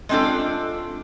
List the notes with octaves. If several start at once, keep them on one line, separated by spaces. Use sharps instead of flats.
G#3 A3 C4 D4 F4 A4